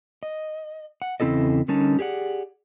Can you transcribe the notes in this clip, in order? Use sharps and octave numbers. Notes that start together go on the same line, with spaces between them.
D#5
F#5
E2 C#3 C4 E4 A4 D#5
D3 G3 C#4 D#4 A#4 A5
G4 G#4 D5 F#5